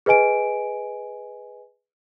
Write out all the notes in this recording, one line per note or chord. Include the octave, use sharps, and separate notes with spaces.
G#4 B4 D#5 G#5 D7